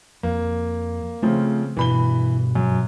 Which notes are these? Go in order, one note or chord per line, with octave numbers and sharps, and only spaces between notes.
F2 A#3
C#3 F3 A3 C4
G2 B2 E3 B5 G7
F#2